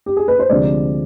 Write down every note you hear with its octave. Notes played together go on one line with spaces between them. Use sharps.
G4
G#4
B4
C5
D2 C3 F3 G#3 D5